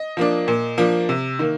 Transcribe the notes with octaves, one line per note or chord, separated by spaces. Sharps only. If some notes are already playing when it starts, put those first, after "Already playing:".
Already playing: D#5
F3 A#3 D4
A#2
F3 A#3 D4
C3
D#3 A#3